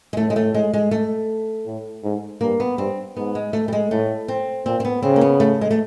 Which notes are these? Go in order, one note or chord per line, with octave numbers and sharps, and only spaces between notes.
G#3
A2 A3
G#3
A3
G#3
G#3
A3
A2
G#2
G2 A#3
B3
G2 C4
G#2 B3
G#3
A3
G3
G#3
A2 A3
C4
A#2 C4
C4
B3
C#3 C4
A#3
B3
A3
G#3
A3